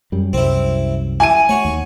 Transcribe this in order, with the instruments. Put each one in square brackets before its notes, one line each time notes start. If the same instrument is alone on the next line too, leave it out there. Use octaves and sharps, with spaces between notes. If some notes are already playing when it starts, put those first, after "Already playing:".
[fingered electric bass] F#2 G3
[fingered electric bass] C2 F#2 [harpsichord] C4 E4
[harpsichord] E4 [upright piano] G#5 D#7
[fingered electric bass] A3 [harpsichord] F#4 C#5
[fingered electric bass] D#2